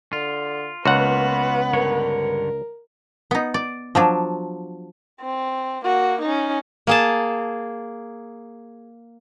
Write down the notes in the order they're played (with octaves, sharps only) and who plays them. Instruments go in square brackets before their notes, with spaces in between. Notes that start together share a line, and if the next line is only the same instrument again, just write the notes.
[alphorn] D3 [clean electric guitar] F4
[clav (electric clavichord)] C#2 F#5 [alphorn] A#3 [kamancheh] B3 B4 [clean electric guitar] F4 F#4
[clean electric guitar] G2 D3 C#5 [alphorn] A#4
[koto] B3 D#4
D5
F3 F#3 D4
[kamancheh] C4
A#3 F#4
C#4 D#4
[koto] A#3 G#4 A5